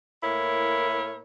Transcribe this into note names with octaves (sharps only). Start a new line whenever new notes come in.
A2 A#3 E4 A#4 C#5